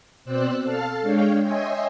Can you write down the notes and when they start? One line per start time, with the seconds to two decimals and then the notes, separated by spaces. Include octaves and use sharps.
0.25 B2 C4 C5 D5 E6 F#6
0.63 A4 F5 A5 F6
1.01 G#3 D4 C#5 F5 G5
1.41 C#5 D#5 E5 G5 G#5 C6